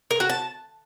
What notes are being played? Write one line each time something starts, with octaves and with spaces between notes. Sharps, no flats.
A#4
F#4
A5